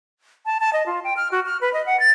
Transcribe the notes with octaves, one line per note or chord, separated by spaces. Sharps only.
A5
A5
D#5
F4
G5
F6
F#4
F6
B4
D#5
F#5
A6